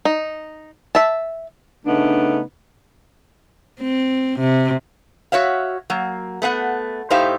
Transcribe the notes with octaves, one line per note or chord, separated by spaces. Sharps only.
D#4
E5 A5
C#3 A3 B3 D4 D#4
C4
C3
F#4 C#5 E5 F5
F#3 A#3
A3 B3 F5 F#5
A2 D#4 G4 C5 E5 F5